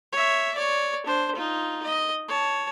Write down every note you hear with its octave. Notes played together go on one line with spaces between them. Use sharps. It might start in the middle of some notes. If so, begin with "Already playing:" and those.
C#5 E5
C#5 D5
D4 C5
D#4 F4
D#5
C#5 A5